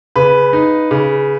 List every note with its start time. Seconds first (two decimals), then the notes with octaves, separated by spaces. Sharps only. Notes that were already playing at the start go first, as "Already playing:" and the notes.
0.16 C#3 B4
0.53 D#4
0.91 C#3